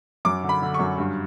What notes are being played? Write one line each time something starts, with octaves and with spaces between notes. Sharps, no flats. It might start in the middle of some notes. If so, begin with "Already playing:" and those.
F#2 D6
D3
B5
D3
C#6
F#2
G2